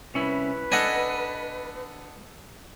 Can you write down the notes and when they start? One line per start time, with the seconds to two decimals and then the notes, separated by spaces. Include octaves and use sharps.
0.14 C2 C#4 E4 B4
0.72 D4 A4 D#5 F#5 G#5